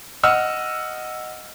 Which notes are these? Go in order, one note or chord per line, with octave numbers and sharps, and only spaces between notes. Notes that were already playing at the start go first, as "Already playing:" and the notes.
D#5 F#5 E6 F6